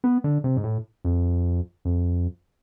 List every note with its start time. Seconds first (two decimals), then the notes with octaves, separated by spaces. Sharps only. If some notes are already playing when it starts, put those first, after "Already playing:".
0.04 B3
0.24 D3
0.44 C3
0.57 G#2
0.64 A2
1.04 F2
1.85 F2